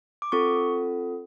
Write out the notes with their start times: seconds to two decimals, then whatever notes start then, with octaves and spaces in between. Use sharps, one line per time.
0.22 D6
0.32 C4 F4 A4 C#6